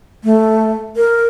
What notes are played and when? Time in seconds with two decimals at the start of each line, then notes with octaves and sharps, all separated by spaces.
0.24 A3
0.97 A#4